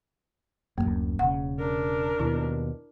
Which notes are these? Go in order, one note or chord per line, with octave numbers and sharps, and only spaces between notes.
D1 G#1 F#2 A#3
E1 C#3 F#5
D4 A#4
D#2 B2 E4